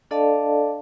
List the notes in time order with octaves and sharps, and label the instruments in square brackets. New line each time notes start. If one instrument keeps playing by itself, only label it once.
[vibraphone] D4 A4 D5 D#5 F5 A5